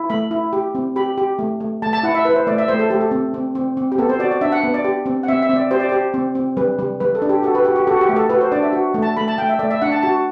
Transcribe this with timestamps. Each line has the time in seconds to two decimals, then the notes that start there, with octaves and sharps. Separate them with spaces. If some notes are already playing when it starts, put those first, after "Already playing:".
Already playing: E4
0.10 A3 B5
0.31 E4
0.53 G4
0.75 C4
0.96 G4 B5
1.18 G4
1.39 A3
1.60 A3
1.82 A3 A5
1.93 A5
2.03 E4 F#5
2.15 E5
2.25 E4 B4
2.36 C5
2.47 A3 D5
2.58 E5
2.68 A3 C5
2.79 A4
2.90 A3 G4
3.01 A4
3.11 C4
3.34 C4
3.55 C4
3.77 C4
3.92 G4
3.98 B3 A4
4.09 C5
4.19 F#4 D5
4.31 D5
4.41 D4 E5
4.52 F#5
4.64 B3
4.74 D5
4.84 G4
5.06 C4
5.23 F#5
5.28 C4 E5
5.42 E5
5.49 C4
5.56 D5
5.71 G4 C5
5.80 D5
5.89 G4 C5
6.14 C4
6.35 C4
6.57 G3 B4
6.79 G3
7.00 G3 B4
7.15 A4
7.22 D4
7.29 G4
7.43 F#4 A4
7.55 B4
7.65 F#4 G4
7.76 G4
7.87 F#4 A4
8.01 G4
8.09 A3
8.16 A4
8.30 F#4 B4
8.41 C5
8.52 D4 D5
8.62 E5
8.73 F#4
8.94 A3
9.02 A5
9.17 A3 B5
9.28 A5
9.38 A3 G5
9.49 E5
9.59 A3 D5
9.71 E5
9.82 D4 F#5
9.92 A5
10.03 F#4 A5